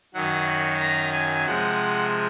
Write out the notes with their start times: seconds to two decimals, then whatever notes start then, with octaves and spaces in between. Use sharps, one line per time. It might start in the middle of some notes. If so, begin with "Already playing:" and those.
0.14 F#2 D#3 F#3 F#5
0.80 A#5
1.13 G#5
1.46 C3 F3 G#3 F#5